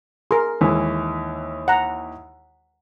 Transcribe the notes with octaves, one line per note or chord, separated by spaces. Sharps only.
G#4 A#4 C6
D#2 E3 G#3 G#5
F#5 A#5